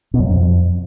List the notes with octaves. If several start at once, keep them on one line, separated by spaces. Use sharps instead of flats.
B2
F#2
G2
F2